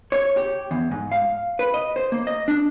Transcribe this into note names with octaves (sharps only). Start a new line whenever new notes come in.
C#5
G4
E2
G#2
F5
B4
D#5
C5
A#3
D#5
D4